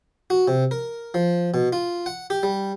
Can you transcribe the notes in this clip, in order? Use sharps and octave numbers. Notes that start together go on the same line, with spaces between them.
F#4
C3
A#4
F3
B2
F4
F#5
G4
G3